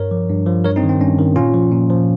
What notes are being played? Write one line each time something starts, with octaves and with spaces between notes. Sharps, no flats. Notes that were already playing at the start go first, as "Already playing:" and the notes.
Already playing: G2 A#4 C#5
F3
G2
F3
G2 A#4 C#5
C4 D#4
D#3
C4
G2 C#4
D#3
A#2 C#4 F4
F3
A#2
F3